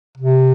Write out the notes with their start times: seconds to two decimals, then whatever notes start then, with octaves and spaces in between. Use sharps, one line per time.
0.17 C3